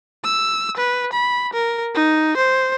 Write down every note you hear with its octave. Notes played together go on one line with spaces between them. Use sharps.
E6
B4
B5
A#4
D#4
C5